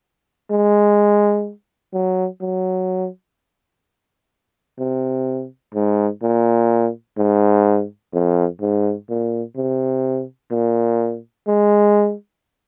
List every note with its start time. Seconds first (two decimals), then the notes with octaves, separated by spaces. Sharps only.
0.51 G#3
1.93 F#3
2.41 F#3
4.79 C3
5.74 G#2
6.22 A#2
7.17 G#2
8.13 F2
8.61 G#2
9.09 A#2
9.57 C3
10.51 A#2
11.47 G#3